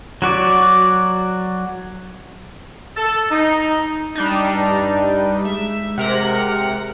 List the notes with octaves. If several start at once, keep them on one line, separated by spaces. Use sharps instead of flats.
F#3 F#4 D5
A4
D#4
G3 D4 D#4
G2
G#3 E5
C3 A#4 F#5